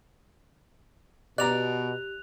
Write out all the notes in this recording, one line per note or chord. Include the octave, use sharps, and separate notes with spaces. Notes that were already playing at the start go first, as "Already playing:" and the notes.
B2 G4 D5 A#5 F#6 F7